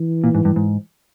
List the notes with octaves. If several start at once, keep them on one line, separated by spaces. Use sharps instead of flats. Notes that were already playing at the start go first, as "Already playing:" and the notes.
Already playing: E3
A#2
G#2
G2
G#2